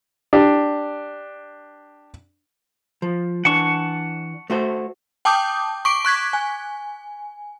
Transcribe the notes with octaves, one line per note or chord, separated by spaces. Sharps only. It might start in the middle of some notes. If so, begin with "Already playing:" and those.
D4 G4
F3
E3 D4 F#5 A5 C#6
A3 F#4 C5
G5 A5 D6 D#6 G6
C#6 D6 D7
C#6 F#6 G#6 B6
G#5